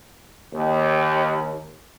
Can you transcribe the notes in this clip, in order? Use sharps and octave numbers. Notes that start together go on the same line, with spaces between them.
D#2